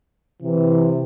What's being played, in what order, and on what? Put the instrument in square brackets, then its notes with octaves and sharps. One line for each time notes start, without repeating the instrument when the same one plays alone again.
[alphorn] C3 [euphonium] E3